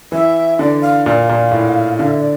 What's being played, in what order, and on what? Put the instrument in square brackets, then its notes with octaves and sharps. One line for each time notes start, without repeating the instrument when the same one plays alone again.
[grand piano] E3 [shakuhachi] E5
[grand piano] D3 [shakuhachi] D5
[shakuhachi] F5
[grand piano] A#2 [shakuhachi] F5
[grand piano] A#2
A2
[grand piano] D3 [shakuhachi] F5
[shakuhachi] E5
D5